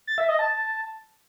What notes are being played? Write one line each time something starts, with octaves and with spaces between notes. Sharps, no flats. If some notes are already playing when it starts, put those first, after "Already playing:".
A6
E5
D#5
A5